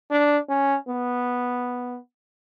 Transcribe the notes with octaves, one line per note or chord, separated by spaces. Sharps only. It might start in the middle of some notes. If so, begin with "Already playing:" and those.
D4
C#4
B3